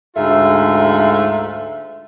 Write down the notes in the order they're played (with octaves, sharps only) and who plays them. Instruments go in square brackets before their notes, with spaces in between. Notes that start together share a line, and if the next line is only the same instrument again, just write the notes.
[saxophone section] D2 G#2 F4 A4 E5